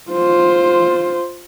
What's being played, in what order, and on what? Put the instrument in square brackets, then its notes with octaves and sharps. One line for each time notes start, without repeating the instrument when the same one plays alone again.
[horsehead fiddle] F4 C5